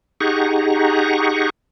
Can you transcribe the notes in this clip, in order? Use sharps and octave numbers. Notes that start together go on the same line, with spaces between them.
D#4 G4 G#4 F#5 A#5 C#6